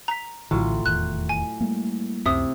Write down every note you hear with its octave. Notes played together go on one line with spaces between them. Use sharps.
A#5 B6
A#1 A2 D3 E3 F#3 F4
D#1 E2 D#3 F#6
G#5
G3 A3 A#3
C#2 F#2 C3 E5 D#6